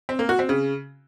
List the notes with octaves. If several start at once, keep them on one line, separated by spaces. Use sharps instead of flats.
C4
A#3
F#4
C4
C#3